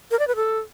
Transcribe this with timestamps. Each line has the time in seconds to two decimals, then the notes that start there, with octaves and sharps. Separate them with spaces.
0.11 A#4
0.19 D5
0.27 B4
0.36 A4